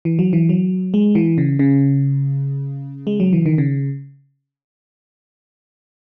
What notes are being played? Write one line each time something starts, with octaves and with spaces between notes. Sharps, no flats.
E3
F#3
E3
F#3
G#3
E3
C#3
C#3
G#3
F#3
E3
D#3
C#3